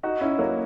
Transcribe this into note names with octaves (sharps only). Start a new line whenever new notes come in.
D#4 F#4
C#4 E4
F#3 A#3